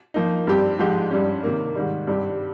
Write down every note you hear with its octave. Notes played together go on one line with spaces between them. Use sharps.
F3 A#3 D#4
G2 G3 C4 G4
G#2 F3 G#3 D#4 G4
G2 G3 C#4
C3 D#3 A#3
G#2 D#3 G3
G2 G3 C4 G4